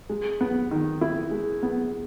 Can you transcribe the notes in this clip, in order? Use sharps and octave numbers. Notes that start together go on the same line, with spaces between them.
G#3
B3
D#3
E4
G#3
B3